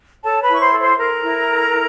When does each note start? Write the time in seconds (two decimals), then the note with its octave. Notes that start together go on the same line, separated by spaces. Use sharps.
0.24 A4 C#5 A5
0.42 B4 B5
0.49 E4 C#6
0.61 C5 C6
0.73 A4
0.79 C5 C6
0.98 A4 A#4 A#5
1.23 E4
1.48 A4
1.73 E4